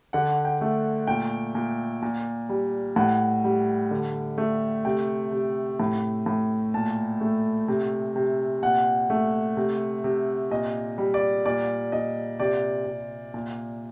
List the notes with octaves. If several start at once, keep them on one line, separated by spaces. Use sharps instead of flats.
D3 F#5
G5
A3
A#2 G5
A#2
A#2
G3
A2 F#5
G3
D3
A3
C3 G5
C3
A2
A2
A#2 A5
A3
C3
C3
A#2 F#5
A3
C3
C3
A#2 D#5
G3
D5
A#2 D5
A#2 D#5
C3 D5
C3
A#2